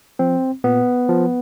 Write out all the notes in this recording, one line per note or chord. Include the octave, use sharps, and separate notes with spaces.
F3 C4
A#2 B3
F3